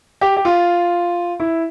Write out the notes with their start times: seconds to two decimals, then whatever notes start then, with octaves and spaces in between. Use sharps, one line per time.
0.21 G4
0.37 G4
0.45 F4
1.40 E4